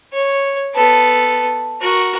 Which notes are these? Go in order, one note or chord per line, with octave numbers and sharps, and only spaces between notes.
C#5
B3 A4
F#4 A#4